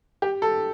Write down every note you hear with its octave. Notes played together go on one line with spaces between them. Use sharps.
G4
A4